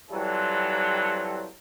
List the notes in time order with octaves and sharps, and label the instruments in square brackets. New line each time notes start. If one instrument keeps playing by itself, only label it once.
[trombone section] E3 F#3 G3 C4 F4 A4